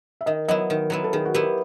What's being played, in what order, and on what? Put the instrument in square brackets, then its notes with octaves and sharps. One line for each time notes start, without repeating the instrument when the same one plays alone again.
[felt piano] E5
[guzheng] D#3 [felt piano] D#5
[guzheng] F#3 B3 E4 [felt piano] D#5
[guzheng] D#3
[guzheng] F#3 B3 E4 [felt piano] A#4
[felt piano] A4
[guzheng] D#3 [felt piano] G#4
[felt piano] F#4
[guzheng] F#3 B3 E4 [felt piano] G4